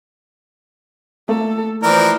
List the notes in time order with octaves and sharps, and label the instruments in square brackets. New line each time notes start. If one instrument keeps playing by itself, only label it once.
[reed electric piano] A3 A#3 [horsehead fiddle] A4
[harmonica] E3 F3 A#4 [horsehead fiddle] C5 D5